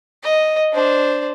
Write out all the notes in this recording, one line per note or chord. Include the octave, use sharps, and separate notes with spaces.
D#5
D4 C5